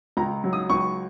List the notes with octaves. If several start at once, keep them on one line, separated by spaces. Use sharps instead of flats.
C#2 A#5
F#3
D#6
C#2 C#6